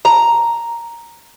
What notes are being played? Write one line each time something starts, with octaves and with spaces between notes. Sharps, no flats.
A#5